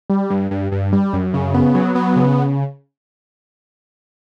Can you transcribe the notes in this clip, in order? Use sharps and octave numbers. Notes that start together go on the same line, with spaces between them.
G3
G2
G2
G2
G3
F#2
C#3
B3
F#3
B3
C#3